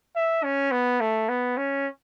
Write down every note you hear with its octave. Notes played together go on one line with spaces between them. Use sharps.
E5
C#4
B3
A3
B3
C#4